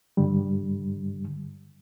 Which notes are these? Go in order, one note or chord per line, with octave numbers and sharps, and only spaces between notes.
G2 D3 G3